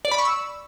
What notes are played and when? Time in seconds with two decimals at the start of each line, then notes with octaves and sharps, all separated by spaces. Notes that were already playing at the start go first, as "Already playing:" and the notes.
0.05 D5
0.11 B5
0.18 C#6
0.25 E6